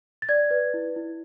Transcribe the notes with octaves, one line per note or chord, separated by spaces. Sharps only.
A6
D5 G#6
B4
E4
E4